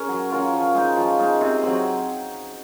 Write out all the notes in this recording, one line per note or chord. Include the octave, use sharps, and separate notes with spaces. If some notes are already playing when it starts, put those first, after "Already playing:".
Already playing: C#4 D#4 G#4 A#4
F#3
C#4 F4 A#4
F3
G#3 D#4
F3
G#3 D#4
C3
F#3 C4